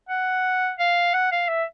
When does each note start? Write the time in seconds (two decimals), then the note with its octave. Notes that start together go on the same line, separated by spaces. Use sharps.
0.09 F#5
0.79 F5
1.14 F#5
1.32 F5
1.48 E5